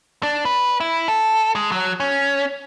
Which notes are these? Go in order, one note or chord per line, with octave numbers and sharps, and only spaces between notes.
D4
B4
E4
A4
G#3
F#3
C#4